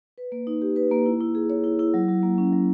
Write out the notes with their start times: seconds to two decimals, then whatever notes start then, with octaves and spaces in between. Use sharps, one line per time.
0.18 B4
0.32 A#3
0.47 D#4
0.62 G4
0.76 B4
0.91 A#3
1.06 E4
1.21 E4
1.35 G#4
1.50 C#5
1.64 E4
1.79 E4
1.94 F#3
2.08 F#3
2.23 A#3
2.38 C#4
2.52 F#3